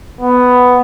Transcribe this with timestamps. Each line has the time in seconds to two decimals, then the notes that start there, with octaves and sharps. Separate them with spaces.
0.21 B3